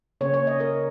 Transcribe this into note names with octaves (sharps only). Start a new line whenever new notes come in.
C#3 A#3 C#4 C#5
C#5
D#5
A#4